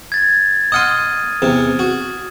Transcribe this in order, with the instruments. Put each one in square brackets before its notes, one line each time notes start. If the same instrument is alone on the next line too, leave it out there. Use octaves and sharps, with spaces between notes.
[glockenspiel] G#6 A6
[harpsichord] D#5 F#5 C6 [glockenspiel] D#6 F6 D#7
[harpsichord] E2 C3
F#4